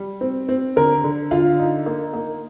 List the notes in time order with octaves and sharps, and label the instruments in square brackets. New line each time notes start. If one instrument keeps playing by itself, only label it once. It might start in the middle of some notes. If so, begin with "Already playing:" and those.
Already playing: [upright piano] G3
C4
C4
[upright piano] D3 [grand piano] A#4
[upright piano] D3
[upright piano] D3 [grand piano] F4 F5
[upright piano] D#4
A#3
A#3